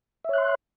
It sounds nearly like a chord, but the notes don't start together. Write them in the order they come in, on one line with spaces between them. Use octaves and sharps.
E5 C#5 F#6 C6